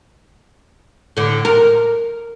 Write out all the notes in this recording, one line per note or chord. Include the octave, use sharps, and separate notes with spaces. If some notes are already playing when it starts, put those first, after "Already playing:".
A2 D3
A#4